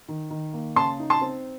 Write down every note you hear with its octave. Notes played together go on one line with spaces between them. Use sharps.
D#3
D#3
A#3
C#3 A5 C6
D#4
A5 C6
C4